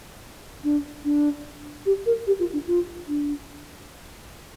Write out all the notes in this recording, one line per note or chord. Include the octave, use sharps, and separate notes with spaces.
D4
D4
G4
A#4
G4
F4
D4
F4
D4